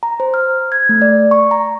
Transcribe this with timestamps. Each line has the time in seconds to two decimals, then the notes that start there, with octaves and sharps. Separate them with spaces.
0.03 A#5
0.20 C5
0.34 F6
0.72 G#6
0.89 A3
1.02 D5
1.31 C#6
1.51 A#5